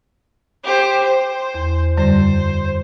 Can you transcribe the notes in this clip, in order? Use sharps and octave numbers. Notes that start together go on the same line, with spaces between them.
G4 C5
C5
E2
F#2 D3 G3 C5